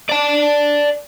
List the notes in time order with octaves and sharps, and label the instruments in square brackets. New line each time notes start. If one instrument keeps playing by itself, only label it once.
[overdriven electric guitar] D5 A5